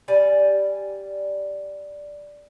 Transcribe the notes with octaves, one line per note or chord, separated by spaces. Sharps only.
G3 D5 G#5